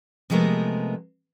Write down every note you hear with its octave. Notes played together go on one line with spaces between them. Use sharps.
C3 F3 G#3 A3 B3 A#4